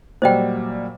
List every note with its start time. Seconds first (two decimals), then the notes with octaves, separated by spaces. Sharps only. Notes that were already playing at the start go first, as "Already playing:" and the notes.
0.22 A#2 F#3 G3 C5 D#5 G5